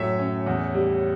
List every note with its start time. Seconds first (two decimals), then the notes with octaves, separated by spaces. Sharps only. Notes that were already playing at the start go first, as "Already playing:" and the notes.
Already playing: F#2 A2 F#3 C#5 E5
0.18 C#4
0.46 E2
0.74 G3